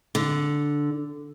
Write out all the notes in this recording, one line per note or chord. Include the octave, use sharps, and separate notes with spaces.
D3